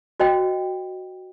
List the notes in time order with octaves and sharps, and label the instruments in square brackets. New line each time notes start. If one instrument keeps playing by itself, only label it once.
[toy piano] F#4 C5 D#5 G5